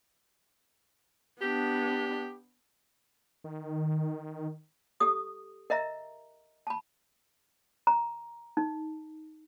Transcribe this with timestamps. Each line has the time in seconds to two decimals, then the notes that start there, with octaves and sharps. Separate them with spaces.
1.41 B3 D4 G4
3.44 D#3
5.00 G4 A4 D#6
5.70 A#4 D#5 E5 A#5
6.67 A5 B5
7.87 A#5
8.57 D#4